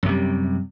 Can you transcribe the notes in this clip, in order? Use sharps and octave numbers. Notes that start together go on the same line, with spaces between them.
F#2 C3 G3